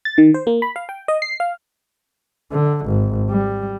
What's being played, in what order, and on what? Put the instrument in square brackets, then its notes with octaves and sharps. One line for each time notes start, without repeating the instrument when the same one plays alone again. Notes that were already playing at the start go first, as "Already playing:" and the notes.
[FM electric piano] A6
D#3
C5
A#3
B5
F5
G5
D#5
C7
F5
[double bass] D3
G#1
G3